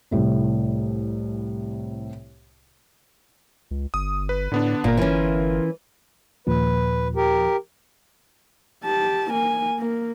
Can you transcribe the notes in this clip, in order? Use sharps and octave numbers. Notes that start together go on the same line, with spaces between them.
C2 A2 C3
C#2
G1 D#6
B4
A2 D3 B3 D4
G1 A#2 F4 A#4
E3 C#4
D#2 A#2 F3 B4
G4 A#4
G4 A5
A#3 G#5
A#3